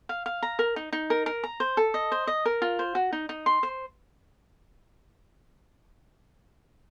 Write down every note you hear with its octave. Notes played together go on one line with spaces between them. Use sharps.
F5
F5
A#5
A#4
D#4
D#4
A#4
A#4
A#5
C5
A4
D#5
C5
D#5
A#4
F4
C5
F#4
D#4
D#4
C6
C5